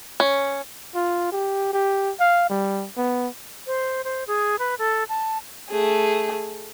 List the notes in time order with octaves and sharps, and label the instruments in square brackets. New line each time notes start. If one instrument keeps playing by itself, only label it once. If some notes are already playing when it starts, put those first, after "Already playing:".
[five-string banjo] C#4
[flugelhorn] F4
G4
G4
F5
G3
B3
[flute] C5
C5
G#4
B4
A4
A5
[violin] A3 G#4